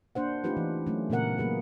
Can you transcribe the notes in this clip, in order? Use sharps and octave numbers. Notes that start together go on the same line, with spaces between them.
A#3 D4 C5 F#5
A3 C#4 D#4 F4 G4 B4
E3
F#3 A3 C#4
A#2 C#3 A#3 B3 A#4 F#5
F#3 A#3 G#4 B4